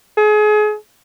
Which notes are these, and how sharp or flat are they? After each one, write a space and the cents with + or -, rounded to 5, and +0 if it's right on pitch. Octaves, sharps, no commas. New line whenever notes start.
G#4 +30